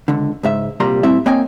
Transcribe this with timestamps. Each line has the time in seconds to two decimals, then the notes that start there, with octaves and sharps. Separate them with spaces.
0.08 C#2 D3
0.43 C#2 G#2 E5
0.80 C2 A#2 G3 A#5 C6
1.03 A2 G3 C4 E4 E5
1.26 A#3 C4 C#5 D#5 G5 G#5